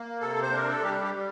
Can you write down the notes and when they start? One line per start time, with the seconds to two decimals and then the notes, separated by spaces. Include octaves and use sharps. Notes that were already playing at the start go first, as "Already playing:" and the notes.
Already playing: A#3
0.20 C3 A4
0.42 C5
0.51 D4 A#4
0.69 A4
0.82 G3 G4
1.03 G4
1.15 G3